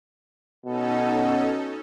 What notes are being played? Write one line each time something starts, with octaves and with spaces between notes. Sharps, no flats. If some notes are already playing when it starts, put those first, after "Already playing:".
B2 C#4 D#4 A4